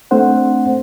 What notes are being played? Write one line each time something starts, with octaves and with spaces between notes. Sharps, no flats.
A3 C4 D4 C5 F#5